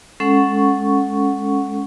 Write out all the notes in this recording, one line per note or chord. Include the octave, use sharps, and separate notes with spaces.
G#3 C#4 A4 F#5 C#6